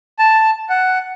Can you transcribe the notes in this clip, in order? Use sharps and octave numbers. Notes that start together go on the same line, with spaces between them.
A5
F#5